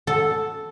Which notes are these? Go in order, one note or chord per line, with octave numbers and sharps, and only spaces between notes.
A4